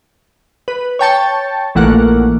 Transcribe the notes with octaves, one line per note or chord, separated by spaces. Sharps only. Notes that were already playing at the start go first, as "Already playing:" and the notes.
B4
C#5 G5 A5 C#6
A#1 E3 A3 A#3 F#5